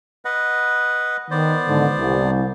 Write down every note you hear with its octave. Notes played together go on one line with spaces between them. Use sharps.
B4 D#5 F#5
D#3 B3 C5 D5
G#2 B2 D3
C2